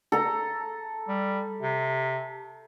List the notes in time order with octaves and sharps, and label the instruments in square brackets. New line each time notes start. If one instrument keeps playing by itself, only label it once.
[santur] A4 A#5
[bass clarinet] G3
C3